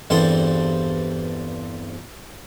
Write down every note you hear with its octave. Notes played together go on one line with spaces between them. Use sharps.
E2 G2 C4 A4